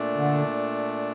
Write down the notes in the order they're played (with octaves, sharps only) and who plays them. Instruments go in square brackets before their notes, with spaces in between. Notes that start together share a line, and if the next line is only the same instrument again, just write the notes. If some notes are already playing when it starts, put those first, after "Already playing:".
Already playing: [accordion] A#2 A3 D4
[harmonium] D3